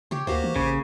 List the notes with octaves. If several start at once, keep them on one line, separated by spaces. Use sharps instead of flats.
C#3 G4 C#5
D2 A#3 F#4 G4 C5 C#5
E3
A1 C#3